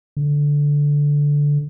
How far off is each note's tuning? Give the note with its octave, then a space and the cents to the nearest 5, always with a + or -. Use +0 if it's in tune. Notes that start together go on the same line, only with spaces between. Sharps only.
D3 -10